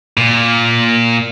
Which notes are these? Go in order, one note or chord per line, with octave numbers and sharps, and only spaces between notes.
A#2